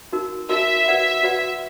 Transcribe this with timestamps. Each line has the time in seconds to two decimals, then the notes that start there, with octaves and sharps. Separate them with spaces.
0.12 D#4 F#4 A#4
0.49 D#4 F#4 A#4 E5
0.86 F#4 B4 D5 F#5 B5
1.23 F#4 B4 D5 F#5 B5